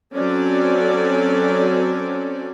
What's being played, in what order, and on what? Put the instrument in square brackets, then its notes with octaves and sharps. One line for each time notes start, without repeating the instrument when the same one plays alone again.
[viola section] F#3 C4 C#4 A4 D5